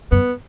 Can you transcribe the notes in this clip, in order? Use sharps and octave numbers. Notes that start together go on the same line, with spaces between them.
F#2 B3